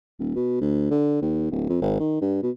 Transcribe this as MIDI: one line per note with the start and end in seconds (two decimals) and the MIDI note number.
0.19 0.31 27
0.36 0.57 47
0.61 0.88 38
0.91 1.20 50
1.22 1.50 39
1.51 1.66 26
1.69 1.78 41
1.82 1.96 32
1.99 2.18 51
2.21 2.38 43
2.43 2.51 47